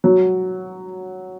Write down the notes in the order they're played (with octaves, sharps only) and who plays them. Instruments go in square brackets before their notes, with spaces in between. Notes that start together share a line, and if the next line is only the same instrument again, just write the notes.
[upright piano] F#3